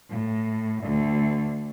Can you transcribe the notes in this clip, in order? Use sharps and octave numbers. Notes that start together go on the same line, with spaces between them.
A2
D2